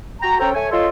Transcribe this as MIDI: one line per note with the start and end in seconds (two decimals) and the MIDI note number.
0.22 0.36 66
0.22 0.36 79
0.22 0.36 82
0.40 0.53 61
0.40 0.53 69
0.40 0.53 72
0.40 0.53 79
0.40 0.53 82
0.54 0.71 57
0.54 0.71 73
0.54 0.71 80
0.71 0.88 65
0.71 0.88 69
0.71 0.88 73
0.71 0.88 75
0.71 0.88 84